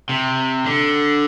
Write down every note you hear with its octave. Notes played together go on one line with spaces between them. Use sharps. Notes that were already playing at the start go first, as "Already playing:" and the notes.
C3
D3